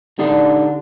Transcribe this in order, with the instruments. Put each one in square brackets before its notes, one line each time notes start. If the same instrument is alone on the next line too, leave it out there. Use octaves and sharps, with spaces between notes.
[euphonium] D3 [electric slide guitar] D4 D#4 G4